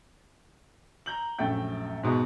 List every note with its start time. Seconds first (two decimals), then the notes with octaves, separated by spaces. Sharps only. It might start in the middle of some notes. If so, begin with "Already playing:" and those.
1.06 A#5 G6 F#7
1.39 A#1 F#2 A3 G5 G6
2.03 G#2 B2 B3 D#4